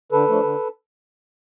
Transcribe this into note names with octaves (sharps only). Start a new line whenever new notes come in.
D3 A4 B4
F3 A3 D4
D3